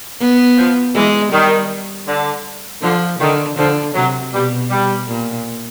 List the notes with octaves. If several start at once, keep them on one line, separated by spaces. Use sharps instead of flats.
B3
F3
E3 G#3
D#3 G3
D3
D3 F3
D3 D#3
D3 F3
C3 F#3
B2 G3
G3
A#2